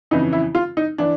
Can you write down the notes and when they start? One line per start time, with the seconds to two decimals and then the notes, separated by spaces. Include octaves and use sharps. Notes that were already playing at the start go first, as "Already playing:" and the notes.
0.11 F2 C#3 E3 D#4
0.33 E4
0.55 F4
0.77 D#4
0.98 E3 D4